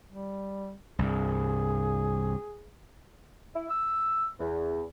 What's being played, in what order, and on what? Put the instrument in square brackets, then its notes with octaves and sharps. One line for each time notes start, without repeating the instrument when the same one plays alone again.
[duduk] G3
[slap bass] C2 G2 [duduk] G#4
[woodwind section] E4
E6
E2